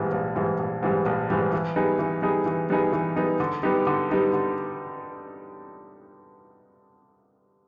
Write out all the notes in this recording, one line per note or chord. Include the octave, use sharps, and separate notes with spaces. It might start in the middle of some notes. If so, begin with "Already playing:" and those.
Already playing: A#1 G#2 E3 G3
A#1
G#2 E3 G3
A#1
G#2 E3 G3
A#1
G#2 E3 G3
E3
G3 B3 D#4 G#4
E3
G3 B3 D#4 G#4
E3
G3 B3 D#4 G#4
E3
G3 B3 D#4 G#4
D3
G3 B3 D#4 G4
D3
G3 B3 D#4 G4
D3